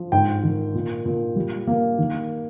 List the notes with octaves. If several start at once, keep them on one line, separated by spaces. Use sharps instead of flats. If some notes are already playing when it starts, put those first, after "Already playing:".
Already playing: F3
G#2 G5
D#3
A#2
A#2
G3
A#3
D#3